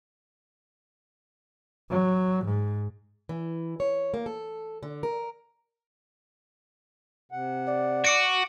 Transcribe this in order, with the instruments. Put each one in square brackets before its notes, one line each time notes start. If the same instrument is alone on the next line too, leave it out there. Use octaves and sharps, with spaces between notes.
[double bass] F#3
G#2
[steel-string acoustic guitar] E3
C#5
A#3
A4
D3
A#4
[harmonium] C3 F#5
[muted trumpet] D5
[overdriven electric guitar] F#4 [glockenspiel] D6 C#7 D7